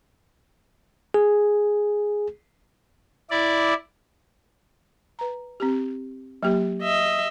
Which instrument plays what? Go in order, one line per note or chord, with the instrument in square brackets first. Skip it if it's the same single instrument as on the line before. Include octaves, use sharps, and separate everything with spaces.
[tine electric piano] G#4
[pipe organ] E4 D5
[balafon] B4 A#5
C4 G4
F#3 A#3 G4
[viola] D#5 E5